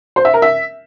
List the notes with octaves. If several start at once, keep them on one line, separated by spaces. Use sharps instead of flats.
C5
E5
A#4
E5